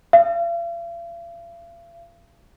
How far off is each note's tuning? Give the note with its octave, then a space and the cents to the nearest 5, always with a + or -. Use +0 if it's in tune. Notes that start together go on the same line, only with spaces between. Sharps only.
F5 -45